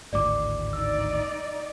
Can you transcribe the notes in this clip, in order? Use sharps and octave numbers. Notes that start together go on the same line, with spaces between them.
G#1 D2 A2 D5 D6
D#4 D5 E6